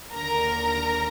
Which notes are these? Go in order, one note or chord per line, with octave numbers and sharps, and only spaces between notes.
D#2 D3 A#4 A#5